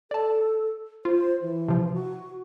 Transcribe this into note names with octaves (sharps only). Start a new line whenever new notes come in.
A4 D5 A5
F4 C5
E3
C3 F3
F#4